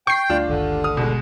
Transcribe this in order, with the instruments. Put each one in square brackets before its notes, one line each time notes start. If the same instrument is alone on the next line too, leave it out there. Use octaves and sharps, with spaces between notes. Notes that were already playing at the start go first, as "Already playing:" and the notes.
[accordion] G5 [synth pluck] C#6 C7 [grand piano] G6
[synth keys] D2 G3 [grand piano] D4 F4
[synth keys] G#1 D2 G2 [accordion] D3
[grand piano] D#6 F6
B2 G#3